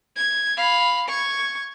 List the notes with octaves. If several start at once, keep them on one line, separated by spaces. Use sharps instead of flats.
G#6
F5 B5
C#6 G#6